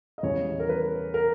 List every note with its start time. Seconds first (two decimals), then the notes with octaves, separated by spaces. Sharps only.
0.18 D#5
0.23 E2 C#3 G3 C#5
0.60 A#4
0.69 B4
1.14 A#4